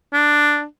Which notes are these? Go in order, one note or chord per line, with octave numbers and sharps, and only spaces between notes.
D4